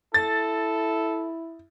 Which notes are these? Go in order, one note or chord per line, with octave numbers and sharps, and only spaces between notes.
E4 A4 A6